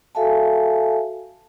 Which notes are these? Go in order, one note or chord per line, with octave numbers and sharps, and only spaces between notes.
F#4 A4 E5 F5 G#5 A5